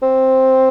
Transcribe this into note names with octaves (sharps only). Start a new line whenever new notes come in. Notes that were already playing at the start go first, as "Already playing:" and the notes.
C4